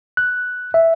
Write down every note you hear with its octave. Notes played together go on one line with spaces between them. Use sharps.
F#6
E5